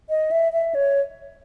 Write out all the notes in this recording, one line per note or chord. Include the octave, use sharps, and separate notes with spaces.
D#5
E5
E5
C#5